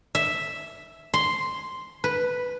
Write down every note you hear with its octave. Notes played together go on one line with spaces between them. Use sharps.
E5
C6
B4